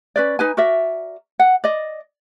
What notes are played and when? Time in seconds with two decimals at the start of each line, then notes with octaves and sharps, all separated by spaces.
0.16 C#4 B4 D5
0.39 D#4 B4 G#5
0.57 F#4 A#4 D5 E5
1.39 F#5
1.64 D5 D#5